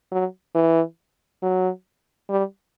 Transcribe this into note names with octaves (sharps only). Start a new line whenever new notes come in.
F#3
E3
F#3
G3